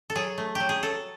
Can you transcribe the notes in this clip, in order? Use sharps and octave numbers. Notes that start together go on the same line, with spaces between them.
A4
F#3 G#4
A3
F#3 G4
G#4
F#3 A4